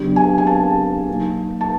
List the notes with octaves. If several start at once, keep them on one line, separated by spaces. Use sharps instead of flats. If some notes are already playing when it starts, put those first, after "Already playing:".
Already playing: C#3 F#3 B3 D4 G4
G#5
G#5
A5
B2 F#3 A#3 D#4
A5